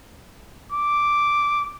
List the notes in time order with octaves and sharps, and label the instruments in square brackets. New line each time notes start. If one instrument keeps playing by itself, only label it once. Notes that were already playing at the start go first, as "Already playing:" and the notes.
[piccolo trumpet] D6